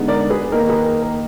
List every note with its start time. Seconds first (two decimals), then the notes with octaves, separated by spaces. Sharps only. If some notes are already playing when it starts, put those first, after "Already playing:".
Already playing: D3 G#3 B3 D#4
0.08 A#4 D5
0.30 G#4 B4
0.52 D#3 A#3 D#4 A#4
0.69 G#4 B4
0.85 A#4
1.02 A#4